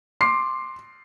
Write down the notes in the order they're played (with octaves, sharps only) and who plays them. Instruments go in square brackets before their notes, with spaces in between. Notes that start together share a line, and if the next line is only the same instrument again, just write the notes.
[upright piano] C6 D6 C7